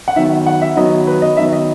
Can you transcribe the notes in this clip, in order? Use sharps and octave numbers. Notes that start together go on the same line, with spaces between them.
F#5
D#3 F#3 B3 E5
F#5
E5
D#3 F#3 B3 D#5
B4
D#5
D#3 F#3 B3 E5
D#5